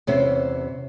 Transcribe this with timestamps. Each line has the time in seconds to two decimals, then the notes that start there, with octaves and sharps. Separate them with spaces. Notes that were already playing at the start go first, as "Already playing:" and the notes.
0.07 E2 C3 C#4 C5 E5